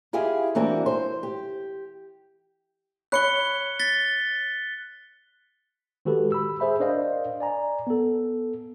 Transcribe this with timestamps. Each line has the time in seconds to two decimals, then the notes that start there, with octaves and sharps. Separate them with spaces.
0.13 E4 F4 G4 G#4 D#5
0.55 E3 A#3 C4 D4 F#4
0.86 C5
1.23 G4
3.12 C#5 B5 F#6 C#7 G7
3.80 A6 B6 G7
6.05 D#3 G#3 F#4 G4 A4 B4
6.32 B5 E6
6.60 G#4 C5 E5 B5
6.80 D4 A#4 C5 D5 D#5 F5
7.40 D5 G#5 A#5
7.87 B3 A4